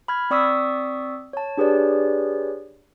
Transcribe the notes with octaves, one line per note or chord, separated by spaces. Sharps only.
B5 F6 G#6
C4 D5 C#6 D#6 E6 B6
C#5 A5
D4 G4 G#4 B4 C#5 D5